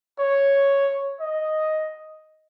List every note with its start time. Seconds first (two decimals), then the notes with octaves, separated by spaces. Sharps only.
0.19 C#5
1.20 D#5